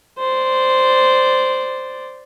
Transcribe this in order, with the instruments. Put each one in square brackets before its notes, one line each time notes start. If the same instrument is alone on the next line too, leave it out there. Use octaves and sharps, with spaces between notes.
[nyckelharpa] C5 D5